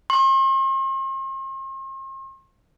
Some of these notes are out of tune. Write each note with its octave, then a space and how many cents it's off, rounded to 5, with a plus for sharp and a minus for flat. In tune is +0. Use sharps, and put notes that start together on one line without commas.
C6 +45